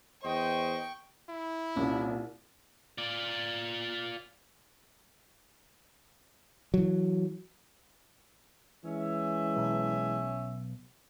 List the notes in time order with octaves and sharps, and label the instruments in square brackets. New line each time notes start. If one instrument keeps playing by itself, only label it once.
[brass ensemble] E2 C5 D#5 [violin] G5 C#6
[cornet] E4
[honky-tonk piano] C2 [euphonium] A#2 [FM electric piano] C#4
[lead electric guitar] F4 D5
[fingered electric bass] E3 F#3
[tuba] E3 [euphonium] G#3 [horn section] C#4 E5
[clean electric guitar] B1